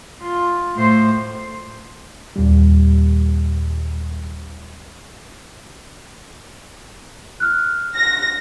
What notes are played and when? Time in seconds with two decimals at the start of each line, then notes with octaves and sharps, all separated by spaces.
0.23 F4
0.76 A2 C5
2.36 D#2 A#2 G3
7.40 F6 F#6
7.96 A#6